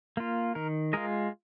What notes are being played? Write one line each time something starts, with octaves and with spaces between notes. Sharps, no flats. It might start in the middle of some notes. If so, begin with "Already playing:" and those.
A#3 F4
D#3 A#4
G#3 F4 A#4 D#5